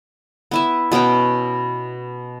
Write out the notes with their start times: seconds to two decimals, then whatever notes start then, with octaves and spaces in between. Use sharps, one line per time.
0.51 B3 E4 E5
0.92 B2 B3 C#4 G5